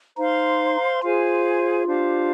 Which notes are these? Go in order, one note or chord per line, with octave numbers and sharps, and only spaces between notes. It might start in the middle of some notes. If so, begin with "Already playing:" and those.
D#4 C5 F5 C6
F4 G#4 C5 F5 G#5
D4 G4 C5 F5